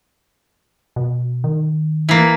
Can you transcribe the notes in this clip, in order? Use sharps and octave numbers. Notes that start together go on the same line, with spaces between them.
B2
D#3
E3 A#3